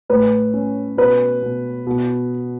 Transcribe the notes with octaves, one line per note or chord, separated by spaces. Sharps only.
A2 B4
C#4
B2 B4
B2
B2